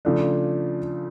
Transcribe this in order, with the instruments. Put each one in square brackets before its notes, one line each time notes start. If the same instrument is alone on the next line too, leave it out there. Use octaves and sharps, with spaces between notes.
[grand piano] C#3 F3 A3 D4